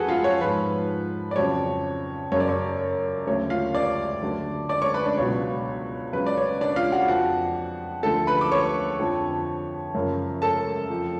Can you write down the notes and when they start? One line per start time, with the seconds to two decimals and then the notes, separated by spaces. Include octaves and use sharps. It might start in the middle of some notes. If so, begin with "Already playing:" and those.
Already playing: F2 F3 F#4 G#4 A4 B4 F#5 G#5
0.08 F4 F5
0.24 C#5
0.40 G#2 F3 B4
1.31 D5
1.36 F2 C#3 F#3 C#5
2.32 F#2 C#3 F#3 C#5
2.40 D5
2.49 C#5
3.26 D2 C#3 F#3 C#5
3.50 F4 F5
3.75 D5 D6
4.22 D2 D3 F#3
4.69 D5 D6
4.82 C#5 C#6
4.94 B4 B5
5.05 D4 D5
5.17 C#2 B2 F#3 C#5
6.12 C#2 C#3 F#3 B4
6.27 D5
6.37 C#5
6.61 D4 D5
6.76 F4 F5
6.92 F#4 F#5
7.08 F2 F3 F#4 F#5
8.03 D2 D3 F3 A4 A5
8.27 B4 B5
8.41 D6
8.52 C#5 C#6
8.99 F2 D3 F3
9.94 F#2 C#3 F3
10.42 A4 A5
10.89 F2 F3